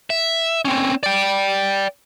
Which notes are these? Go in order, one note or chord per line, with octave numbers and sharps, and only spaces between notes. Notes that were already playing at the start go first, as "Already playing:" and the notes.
E5
C4 C#4
D5 G5